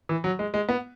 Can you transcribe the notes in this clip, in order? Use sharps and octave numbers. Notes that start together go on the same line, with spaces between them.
E3
F#3
G#3
G#3
B3